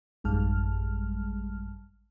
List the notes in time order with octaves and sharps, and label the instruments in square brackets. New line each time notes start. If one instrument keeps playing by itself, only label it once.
[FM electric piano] A1 F#2 G3 G#3 A5 F6